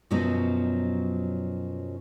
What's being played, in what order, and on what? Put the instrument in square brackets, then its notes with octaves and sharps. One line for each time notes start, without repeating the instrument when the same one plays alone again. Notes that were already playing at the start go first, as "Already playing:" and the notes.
[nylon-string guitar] F#2 B2 F3 F#3 B3 D#4